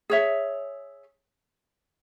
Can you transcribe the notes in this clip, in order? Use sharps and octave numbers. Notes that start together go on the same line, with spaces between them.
G#4 C#5 E5